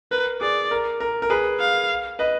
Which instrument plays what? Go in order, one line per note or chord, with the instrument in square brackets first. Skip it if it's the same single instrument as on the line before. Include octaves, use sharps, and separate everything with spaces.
[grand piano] A#4 [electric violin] B4
[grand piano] G#4 [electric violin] D5
[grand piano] A#4
A#4
A#4
G#4 B4
[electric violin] F5
[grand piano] B4 D#5